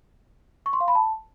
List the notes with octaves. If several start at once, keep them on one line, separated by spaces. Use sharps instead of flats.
C#6
C6
F5
B5
A5